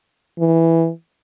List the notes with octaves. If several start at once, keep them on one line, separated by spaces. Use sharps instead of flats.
E3